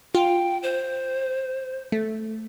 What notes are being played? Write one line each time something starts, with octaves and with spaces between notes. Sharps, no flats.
F4 G5
C5
A3